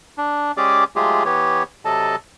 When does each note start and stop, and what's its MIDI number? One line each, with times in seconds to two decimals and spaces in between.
0.18 0.52 62
0.57 0.84 56
0.57 0.84 61
0.57 0.84 67
0.57 0.84 68
0.57 0.84 74
0.57 0.84 86
0.96 1.24 54
0.96 1.24 56
0.96 1.24 57
0.96 1.24 65
0.96 1.24 67
0.96 1.24 68
1.25 1.63 52
1.25 1.63 59
1.25 1.63 67
1.25 1.63 73
1.85 2.16 48
1.85 2.16 54
1.85 2.16 69
1.85 2.16 75
1.85 2.16 81